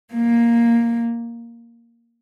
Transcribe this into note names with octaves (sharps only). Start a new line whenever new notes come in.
A#3